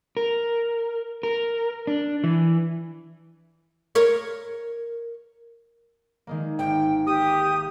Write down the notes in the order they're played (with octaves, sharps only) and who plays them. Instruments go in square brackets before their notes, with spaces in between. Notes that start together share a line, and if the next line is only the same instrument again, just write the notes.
[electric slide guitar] A#4
A#4
D4
E3
[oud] A#4 C#5
[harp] D#3 G#3 A#3
[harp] G#1 [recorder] G5
[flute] G4 [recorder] D#6